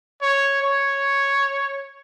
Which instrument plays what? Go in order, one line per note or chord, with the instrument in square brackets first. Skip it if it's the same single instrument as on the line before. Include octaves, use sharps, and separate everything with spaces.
[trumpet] C#5
C#5